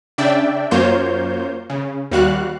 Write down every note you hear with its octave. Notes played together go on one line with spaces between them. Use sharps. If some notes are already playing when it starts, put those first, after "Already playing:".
C#3 D4 D5 E5 G5
F#2 A#3 F4 C5 C#5 G6
C#3
D#2 G3 F#4 F5 F#6